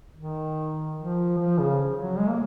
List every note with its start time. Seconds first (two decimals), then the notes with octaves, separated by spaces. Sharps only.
0.17 D#3
0.98 F3
1.38 F3
1.59 C#3
1.99 F#3
2.19 G#3
2.29 A#3